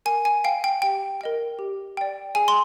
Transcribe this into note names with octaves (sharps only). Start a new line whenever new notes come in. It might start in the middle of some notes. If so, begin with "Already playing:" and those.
A#4 G#5
G#5
F5 G5
G5
G4 G5
A#4 D#5 G5
G4
D5 G5
G#4 G#5
C6